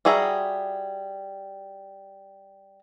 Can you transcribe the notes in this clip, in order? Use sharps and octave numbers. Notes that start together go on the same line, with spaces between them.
G3 F#4 G#4 E5 A#5